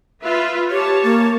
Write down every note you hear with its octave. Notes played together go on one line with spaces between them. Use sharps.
F4 B4 E5
G4 C#5 A5
A#3